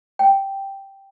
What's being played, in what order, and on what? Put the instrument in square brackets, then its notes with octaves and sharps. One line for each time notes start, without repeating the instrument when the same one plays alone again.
[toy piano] G5